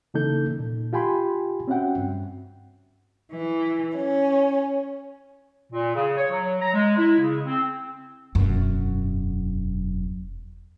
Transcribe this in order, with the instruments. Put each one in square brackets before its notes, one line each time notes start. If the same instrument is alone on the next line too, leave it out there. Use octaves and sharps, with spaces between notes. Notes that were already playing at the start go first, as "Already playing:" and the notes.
[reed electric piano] C#3 E3 A#3 D#4 A4 G6
A#2
F4 G4 G5 G#5 B5 C6
C4 C#4 F#4 E5 F#5 G5
G2
[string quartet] E3
C#4
[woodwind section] A#2
C#3
C#5
F#3
A#5
G#3
E4
C#3
C4
[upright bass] E1 F#2